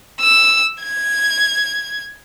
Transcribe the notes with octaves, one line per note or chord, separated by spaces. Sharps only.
E6
G#6